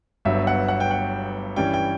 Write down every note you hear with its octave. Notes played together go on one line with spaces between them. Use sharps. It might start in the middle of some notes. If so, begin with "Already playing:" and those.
G1 G2 F#3 B3 E5
F#5
F#5
G5
F#5
G2 E3 G3 C#4 G5
G5